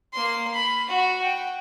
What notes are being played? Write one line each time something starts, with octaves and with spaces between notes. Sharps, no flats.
A#3 C6
B5
F#4
G5